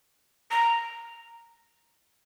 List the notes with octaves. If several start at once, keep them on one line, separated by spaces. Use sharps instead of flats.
A#5